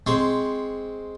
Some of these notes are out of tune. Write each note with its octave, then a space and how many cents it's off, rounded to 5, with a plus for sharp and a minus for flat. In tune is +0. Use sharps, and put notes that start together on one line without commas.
G#3 +0 C4 +0 C#6 +0